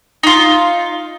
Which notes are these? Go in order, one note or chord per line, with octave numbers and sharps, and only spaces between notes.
D#4 F4